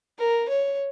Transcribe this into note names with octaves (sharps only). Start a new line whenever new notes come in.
A#4
C#5